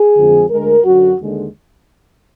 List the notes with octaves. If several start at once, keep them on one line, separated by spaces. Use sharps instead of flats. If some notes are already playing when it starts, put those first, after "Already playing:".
Already playing: G#4
F2 D3 F3 G#3
D2 D3 G#3 A#4
F#2 D3 F#3 F#4
D#2 D3 G#3